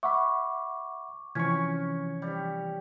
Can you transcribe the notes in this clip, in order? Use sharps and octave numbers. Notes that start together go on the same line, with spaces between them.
E5 F#5 B5 C#6 D6
C3 E3 F3 C#4 C#6 G#6
G3